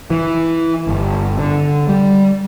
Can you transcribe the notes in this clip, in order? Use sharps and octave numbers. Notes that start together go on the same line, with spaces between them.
E3
G1
D3
G3